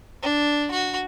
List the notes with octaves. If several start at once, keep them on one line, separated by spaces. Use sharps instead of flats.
D4
F#4